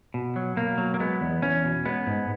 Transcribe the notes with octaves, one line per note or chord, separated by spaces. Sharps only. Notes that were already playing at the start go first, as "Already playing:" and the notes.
B2
F#3
B2 A#3
F#3
A#3
G#3 B3
E2
E2 C#4
B2
G#3 B3
G#2